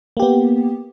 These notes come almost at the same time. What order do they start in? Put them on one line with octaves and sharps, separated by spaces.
A#3 G4 B3